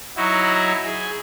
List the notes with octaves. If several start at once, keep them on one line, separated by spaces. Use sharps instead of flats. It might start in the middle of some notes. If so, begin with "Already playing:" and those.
F#3 D#4 E4 F#4
G#4